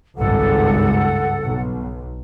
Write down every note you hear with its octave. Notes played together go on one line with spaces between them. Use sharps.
G#1 C#2 G2 A4 F#5
B1